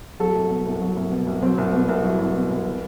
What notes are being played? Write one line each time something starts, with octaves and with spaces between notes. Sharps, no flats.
F#3 A4
C2
B2
C2
F#3
C2
B2
C2
F#3 C4
C2
B2 B3
C2
F#3 E4
C2
B2
C2
E3